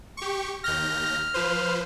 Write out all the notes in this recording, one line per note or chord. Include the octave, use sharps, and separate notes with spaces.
G4 C#6
D#2 F6 G6 A#6
F3 B4 C5